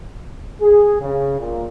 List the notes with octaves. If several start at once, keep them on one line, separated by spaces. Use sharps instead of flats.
G#4
C#3
A#2